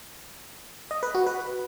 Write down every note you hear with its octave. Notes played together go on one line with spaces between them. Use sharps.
D#5
B4
F#4
B4